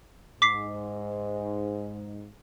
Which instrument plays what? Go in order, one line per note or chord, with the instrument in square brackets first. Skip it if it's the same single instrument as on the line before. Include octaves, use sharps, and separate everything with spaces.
[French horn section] G#2 [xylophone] D6 B6 C7